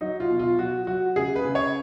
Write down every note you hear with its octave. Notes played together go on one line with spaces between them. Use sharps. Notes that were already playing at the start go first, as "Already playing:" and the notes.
F#3 D#4
F4
B2
F4
F#3 F#4
F#3 F#4
C#3 G#4
B4
C#3
C#5